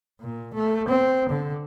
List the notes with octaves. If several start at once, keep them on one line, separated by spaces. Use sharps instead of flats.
A#2
A3
C4
D3